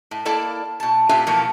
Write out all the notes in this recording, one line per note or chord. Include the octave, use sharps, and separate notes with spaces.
A2
A#3 E4 A4 D5 A5
B2 A5
A#2 D4 F4 G4 E5 G#5
B2 E3 F3 A3 A#3